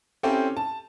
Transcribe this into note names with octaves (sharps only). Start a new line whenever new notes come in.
C4 C#4 E4 G4 A4
A5